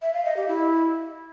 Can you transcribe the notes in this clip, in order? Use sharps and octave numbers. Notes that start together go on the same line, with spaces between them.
E5
F5
D#5
G4
E4